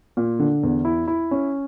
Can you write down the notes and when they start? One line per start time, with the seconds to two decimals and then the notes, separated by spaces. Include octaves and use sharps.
0.17 A#2
0.39 D3
0.63 E2
0.85 E4
1.08 E4
1.31 C#4